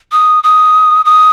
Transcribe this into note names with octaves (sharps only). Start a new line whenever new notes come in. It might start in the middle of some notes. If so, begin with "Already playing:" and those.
D#6
D#6
D#6